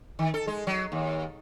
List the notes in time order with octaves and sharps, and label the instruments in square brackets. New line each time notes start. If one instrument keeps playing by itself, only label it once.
[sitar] D#3
A4
G#3
F#3
D#2